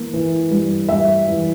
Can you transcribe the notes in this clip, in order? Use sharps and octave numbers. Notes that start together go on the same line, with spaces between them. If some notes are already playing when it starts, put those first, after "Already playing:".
Already playing: E3 A#3
E3
G2
G2 E5
E3